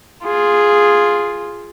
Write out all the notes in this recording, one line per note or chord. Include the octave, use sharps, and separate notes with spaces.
F4 G#4